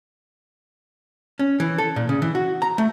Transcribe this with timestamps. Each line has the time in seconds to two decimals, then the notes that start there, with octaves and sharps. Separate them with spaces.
1.39 C#4
1.60 E3
1.78 A4
1.96 A#2
2.09 C#3
2.22 E3
2.35 F#4
2.62 A#5
2.78 A3